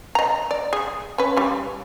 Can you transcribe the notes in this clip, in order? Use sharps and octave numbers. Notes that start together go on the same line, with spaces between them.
D#5 A#5
D5
G#4
C#4 B4
G3 C#4